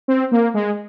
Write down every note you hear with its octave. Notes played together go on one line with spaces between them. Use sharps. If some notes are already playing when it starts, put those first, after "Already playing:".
C4
A#3
G#3